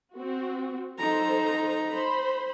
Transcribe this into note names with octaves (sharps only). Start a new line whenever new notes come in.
C4 F#4
D#4 A4 C5 A#5
C5 B5